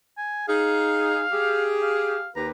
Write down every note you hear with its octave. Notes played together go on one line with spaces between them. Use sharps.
G#5
D#4 G#4 F5
G4 G#4
F5
D#2 G4 B4 A#5